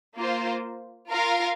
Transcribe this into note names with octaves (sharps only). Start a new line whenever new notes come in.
A#3 F4 C5
F4 A#4 F5